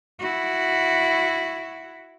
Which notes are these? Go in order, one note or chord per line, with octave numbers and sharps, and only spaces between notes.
E4 F#4